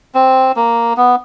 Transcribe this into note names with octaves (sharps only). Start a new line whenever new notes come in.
C4
A#3
B3